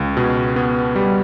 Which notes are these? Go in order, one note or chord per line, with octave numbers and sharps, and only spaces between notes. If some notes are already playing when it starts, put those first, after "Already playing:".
Already playing: C#2
B2
B3
G3